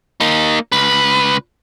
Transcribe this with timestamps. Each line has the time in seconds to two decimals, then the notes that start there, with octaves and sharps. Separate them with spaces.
0.21 A#3 D#4
0.72 C#2 B4